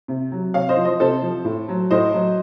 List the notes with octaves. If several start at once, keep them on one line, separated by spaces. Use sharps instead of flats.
C3
F#3
C3 C#5 F5
C5 D#5
F3
C5 D#5
C3 A4 C5
F3
A2
F#3
A2 C5 D#5
F#3